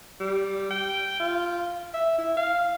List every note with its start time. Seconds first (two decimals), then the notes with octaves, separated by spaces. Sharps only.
0.20 G3
0.71 G5
1.20 F4
1.94 E5
2.18 E4
2.37 F5